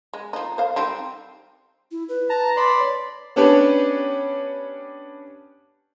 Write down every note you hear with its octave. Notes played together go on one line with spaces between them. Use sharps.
G#3
F3 D#4
C5 F5
G3 C4 D#4
E4
B4
A5 A#5
D5 B5 C6
C#5
B3 C#4 D4 G4 B4 C#5